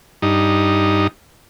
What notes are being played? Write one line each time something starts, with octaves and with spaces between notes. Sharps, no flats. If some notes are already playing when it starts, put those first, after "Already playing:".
G2 D#4